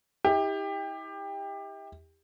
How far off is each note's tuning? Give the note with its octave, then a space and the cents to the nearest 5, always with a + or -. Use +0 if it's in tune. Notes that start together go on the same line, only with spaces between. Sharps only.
E4 -40 G4 +20